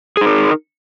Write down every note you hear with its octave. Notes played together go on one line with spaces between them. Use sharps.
D#4 G#4 A#4